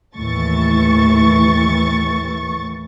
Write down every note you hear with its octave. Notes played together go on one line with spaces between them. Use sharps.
D#2 A2 E3 C#6 A6